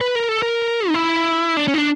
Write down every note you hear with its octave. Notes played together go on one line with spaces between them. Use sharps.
B4
A#4
A4
A#4
D#4
E4
D4
C#4
D#4
D4